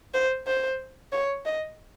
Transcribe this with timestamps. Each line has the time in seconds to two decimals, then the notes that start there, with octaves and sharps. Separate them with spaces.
0.14 C5
0.47 C5
1.12 C#5
1.45 D#5